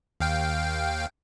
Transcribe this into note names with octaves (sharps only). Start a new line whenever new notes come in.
D#2 F5 G5